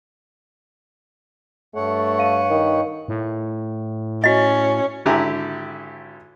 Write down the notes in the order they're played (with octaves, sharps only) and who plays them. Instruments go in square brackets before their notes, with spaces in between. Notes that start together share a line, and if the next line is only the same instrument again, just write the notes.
[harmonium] G2 C#5 F#5 [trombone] A3
[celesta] F5 D#7
[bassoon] D#3
[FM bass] A2
[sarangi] C#4 [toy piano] F#4 D#5
[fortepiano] G#1 D3 E4 G4 G#5 A#5